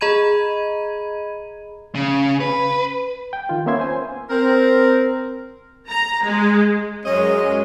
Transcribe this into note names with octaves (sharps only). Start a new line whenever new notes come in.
G#4 D#5 A#5 B5 G#6 D#7
C#3
B4
G5
D#3 F4
A#3 B3 C#4 E5 C6 G#6
C5 G#5
C4 A#4
A#5
G#3
F#2 G#3 C#4 D#5